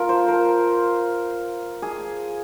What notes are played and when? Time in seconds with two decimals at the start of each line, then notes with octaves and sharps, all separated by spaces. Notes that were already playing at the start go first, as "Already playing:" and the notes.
Already playing: F4 A#4
0.09 C5
0.28 A#4
1.82 G#4